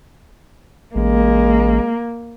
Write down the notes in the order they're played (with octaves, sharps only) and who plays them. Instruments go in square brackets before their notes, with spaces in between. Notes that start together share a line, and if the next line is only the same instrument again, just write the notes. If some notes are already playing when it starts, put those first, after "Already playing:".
[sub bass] A1 [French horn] G#3 [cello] A#3